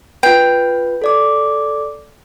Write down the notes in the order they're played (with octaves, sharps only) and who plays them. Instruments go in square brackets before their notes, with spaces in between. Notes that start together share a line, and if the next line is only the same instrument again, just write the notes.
[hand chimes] F4 B4 [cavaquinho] G5
[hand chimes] A4 D5 D6